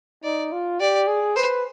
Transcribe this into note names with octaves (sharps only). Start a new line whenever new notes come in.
D#4 D5
F4
G4 D5
G#4
B4 C5